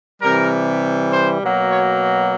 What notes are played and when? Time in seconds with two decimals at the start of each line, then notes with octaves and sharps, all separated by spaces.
0.21 C3 E3 G3 A#4
1.12 C5
1.41 B2 F#3 A#3
1.71 C#5